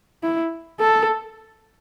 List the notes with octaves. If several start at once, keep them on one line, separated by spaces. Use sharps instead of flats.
E4
A4